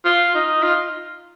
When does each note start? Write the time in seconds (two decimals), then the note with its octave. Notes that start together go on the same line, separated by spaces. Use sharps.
0.05 F4
0.35 D#4
0.62 F4